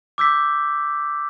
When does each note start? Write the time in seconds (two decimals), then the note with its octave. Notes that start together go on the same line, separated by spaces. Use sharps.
0.18 D6 E6 G6 B6